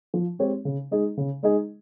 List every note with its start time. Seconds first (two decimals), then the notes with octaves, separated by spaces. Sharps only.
0.14 F3
0.39 G#3 C4 G4 C#5
0.65 C#3
0.91 G#3 D#4 G#4 D#5
1.17 C#3
1.43 G#3 D#4 G#4 D#5